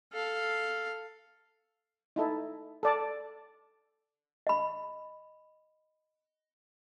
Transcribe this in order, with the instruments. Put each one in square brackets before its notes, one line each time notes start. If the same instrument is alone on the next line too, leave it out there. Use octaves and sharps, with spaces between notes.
[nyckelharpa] A4 F5
[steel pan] D#4 E4 A4
A4 D5 A5
[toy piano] D#5 B5